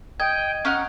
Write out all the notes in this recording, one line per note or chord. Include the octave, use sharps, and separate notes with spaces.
D#5 G5 G#6
C#4 D#4 F#5 F6